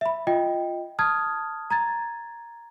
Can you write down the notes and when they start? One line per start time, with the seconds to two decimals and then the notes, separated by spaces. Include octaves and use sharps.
0.01 E5 B5
0.27 F4 D#5 G5
0.99 A5 D#6 F6 G#6
1.70 A#5 G#6 A6